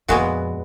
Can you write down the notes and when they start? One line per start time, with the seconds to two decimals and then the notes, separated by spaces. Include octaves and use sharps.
0.08 F2 A#2 G#3 B3 F#4